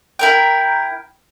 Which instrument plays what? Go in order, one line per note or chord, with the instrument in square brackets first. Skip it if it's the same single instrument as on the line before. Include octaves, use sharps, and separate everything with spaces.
[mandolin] E4 A#4 G5